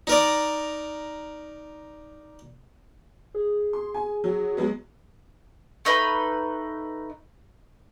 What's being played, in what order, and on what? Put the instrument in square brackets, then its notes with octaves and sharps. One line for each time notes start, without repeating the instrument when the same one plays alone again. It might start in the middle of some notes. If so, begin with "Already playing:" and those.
[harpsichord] D#4 A#4 D5
[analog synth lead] G#4
[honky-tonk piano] C6
G#5
F#3
F#3 G#3 B3
[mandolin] A3 D#4 B4 B5